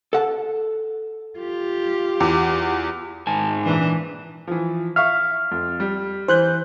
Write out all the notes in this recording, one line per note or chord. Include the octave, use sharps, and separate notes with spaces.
A4 F#5 A5
F4 G4
E2
G#2 G#5 A5
A#2 E3 D4
E3 F3
E5 F5 C#6 F6
F2
G3
E3 C5 F#6 G6